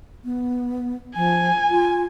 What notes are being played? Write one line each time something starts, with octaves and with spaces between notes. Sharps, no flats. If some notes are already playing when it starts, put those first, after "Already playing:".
B3
F3 G#5
F4